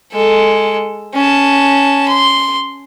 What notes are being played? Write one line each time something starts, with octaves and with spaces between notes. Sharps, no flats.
G#3 A4
C#4 A5
C6